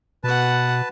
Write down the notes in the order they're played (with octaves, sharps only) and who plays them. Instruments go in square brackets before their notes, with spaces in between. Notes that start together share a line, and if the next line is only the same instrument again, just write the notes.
[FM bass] B2 [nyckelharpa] F#4 F#5 [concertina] B4 A5